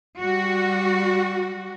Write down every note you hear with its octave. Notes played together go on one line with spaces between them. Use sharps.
G3 F#4